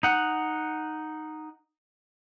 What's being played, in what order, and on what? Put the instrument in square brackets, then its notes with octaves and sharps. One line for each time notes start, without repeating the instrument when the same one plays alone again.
[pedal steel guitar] D#4 F#5